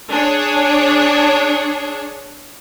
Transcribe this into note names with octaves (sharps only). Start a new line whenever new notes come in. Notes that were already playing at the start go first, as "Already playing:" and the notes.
D4 G#4 C#5